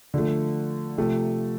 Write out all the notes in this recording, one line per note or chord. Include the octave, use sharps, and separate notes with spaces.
D3 F3 A3
C3 F3 A3